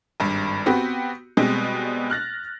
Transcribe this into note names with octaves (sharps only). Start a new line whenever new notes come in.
G#1 G2
B3 C4 F#4 G4 B4
B2 G3 G#3 C4
F6 F#6 A6 A#6